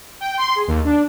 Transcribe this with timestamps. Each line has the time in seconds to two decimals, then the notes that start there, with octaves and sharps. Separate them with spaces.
0.20 G5
0.38 C6
0.55 G#4
0.68 D#2
0.85 D4